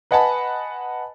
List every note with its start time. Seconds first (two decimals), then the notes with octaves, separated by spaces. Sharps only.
0.11 B4 D#5 F#5 G#5 A5 B5